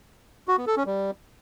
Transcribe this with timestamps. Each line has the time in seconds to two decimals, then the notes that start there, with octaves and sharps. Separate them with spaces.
0.48 F#4
0.57 B3
0.67 A4
0.76 C#4
0.86 G3